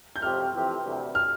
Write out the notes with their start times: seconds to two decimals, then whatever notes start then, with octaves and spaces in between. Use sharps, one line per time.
0.16 G6
0.22 F2 C3 F3 C4 G4 F6
0.53 F2 E3 A3 C4 G4
0.83 D2 C3 E3 G3
1.15 F6